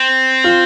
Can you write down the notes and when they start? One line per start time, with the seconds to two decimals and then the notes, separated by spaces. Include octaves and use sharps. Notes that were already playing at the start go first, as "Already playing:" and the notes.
Already playing: C4
0.44 F4